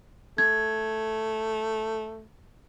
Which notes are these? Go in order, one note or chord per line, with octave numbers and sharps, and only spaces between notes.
A3 G#6